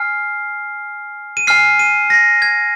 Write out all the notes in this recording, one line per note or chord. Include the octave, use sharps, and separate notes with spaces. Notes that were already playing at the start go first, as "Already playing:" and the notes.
Already playing: G#5 F6 C7
D#7
G#5 F6 C7
D#7
A#6
G#6